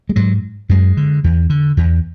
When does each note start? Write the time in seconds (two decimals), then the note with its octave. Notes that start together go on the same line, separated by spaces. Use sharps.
0.09 G#3
0.16 G#2 F#3
0.69 F#2 G#3
0.97 D3
1.24 E2
1.50 D3
1.77 E2